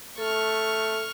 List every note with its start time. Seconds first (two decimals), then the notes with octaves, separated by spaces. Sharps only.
0.18 A3 A4 C#6 F6